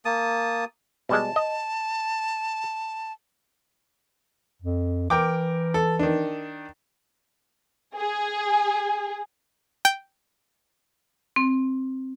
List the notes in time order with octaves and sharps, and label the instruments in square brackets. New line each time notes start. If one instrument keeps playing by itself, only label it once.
[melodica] A#3 A5 D#6
[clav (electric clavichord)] B2 G3 G#3 [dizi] A5
[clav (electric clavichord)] D#5
[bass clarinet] F2
[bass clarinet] E3 [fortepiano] A#4 G5 D6
[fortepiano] A4
D#3 D4
[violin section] G#4
[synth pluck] G5
[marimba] C4